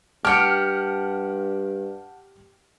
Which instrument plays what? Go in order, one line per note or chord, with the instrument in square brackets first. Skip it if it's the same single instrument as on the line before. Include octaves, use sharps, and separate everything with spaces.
[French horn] G2 [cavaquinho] G4 G5 [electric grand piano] F#5 A5 [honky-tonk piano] F6 C#7